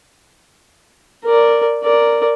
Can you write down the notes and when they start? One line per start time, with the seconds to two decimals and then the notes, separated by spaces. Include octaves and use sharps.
1.24 A#4 D5
1.83 A#4 D5